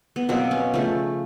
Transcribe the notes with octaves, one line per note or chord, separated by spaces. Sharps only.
B3
B2 F#3 A#3 C4
C#4
C#3 F3 A3